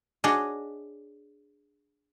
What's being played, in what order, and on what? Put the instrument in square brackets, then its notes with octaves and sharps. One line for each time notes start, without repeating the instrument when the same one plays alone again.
[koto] D4 F#4 G#4 C#5 D#5